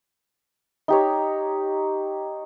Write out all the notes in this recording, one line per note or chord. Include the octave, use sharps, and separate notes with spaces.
D#4 G4 C#5